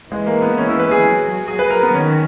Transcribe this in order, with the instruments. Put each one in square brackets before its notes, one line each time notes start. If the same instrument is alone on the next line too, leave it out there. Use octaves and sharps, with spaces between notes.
[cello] E3 [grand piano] G#3
[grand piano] A#3
B3
C#4
E4
B4
G#4
[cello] F#3
[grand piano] G#4
B4
A#4
B3
[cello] D#3 [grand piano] C#4